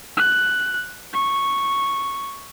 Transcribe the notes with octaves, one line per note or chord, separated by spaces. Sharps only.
F#6
C#6